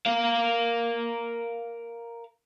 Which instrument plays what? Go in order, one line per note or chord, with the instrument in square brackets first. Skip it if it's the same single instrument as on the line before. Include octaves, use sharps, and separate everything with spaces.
[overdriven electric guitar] A#4 F5